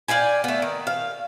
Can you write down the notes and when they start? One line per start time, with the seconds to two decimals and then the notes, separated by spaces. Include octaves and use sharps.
0.08 D5 F5 G5 G#5
0.44 A3 B3
0.62 D#3
0.87 F5